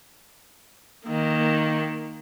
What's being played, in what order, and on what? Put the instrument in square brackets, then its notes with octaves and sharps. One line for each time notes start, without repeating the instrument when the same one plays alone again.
[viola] D#3 A#3